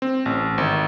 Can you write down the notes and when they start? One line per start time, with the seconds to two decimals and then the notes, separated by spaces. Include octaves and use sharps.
0.02 C4
0.26 A1
0.58 G#1